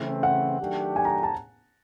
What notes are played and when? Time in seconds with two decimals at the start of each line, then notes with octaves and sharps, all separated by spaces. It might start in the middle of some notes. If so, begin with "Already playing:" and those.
Already playing: C#3 E3 A3 C4
0.23 F#5
0.60 D#3 F#3 A3 D4 G4
0.96 G#5
1.05 A#5
1.23 A5